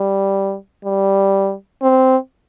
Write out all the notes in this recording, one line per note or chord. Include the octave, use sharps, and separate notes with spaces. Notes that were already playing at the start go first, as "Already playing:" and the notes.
Already playing: G3
G3
C4